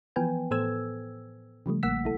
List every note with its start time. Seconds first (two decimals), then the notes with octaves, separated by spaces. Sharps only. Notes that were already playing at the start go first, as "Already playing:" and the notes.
0.16 E3 F3 B3 B4 G5 G#5
0.51 A2 B3 A4 C5 E6 G#6
1.66 C#3 F3 G3 A3
1.83 A1 A#3 F#5 E6 B6
2.04 B1 E4 A4